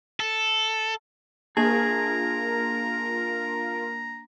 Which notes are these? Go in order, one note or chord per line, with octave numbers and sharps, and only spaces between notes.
A4
A#3 D4 F4 G#4 A#4 A5 A#5